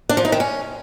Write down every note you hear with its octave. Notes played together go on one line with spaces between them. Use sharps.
D4
F3
D#4
D#3
C#4